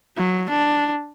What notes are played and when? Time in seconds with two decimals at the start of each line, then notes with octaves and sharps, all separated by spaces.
0.17 F#3
0.50 D4